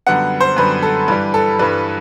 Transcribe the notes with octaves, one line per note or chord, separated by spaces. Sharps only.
F#2 D3 G3 B3 F#5
C5
F#2 D3 G3 B3 B4
A4
G2 E3 G3 B4
A4
G2 E3 G3 B4